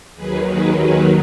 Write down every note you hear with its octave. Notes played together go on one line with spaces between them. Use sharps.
D#2 D#3 F#3 G#4 B4
G#4 B4
G#4 B4